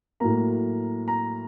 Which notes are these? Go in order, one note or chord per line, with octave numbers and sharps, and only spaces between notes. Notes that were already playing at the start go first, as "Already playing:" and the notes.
A2 F#3 A#3 A#5
A#5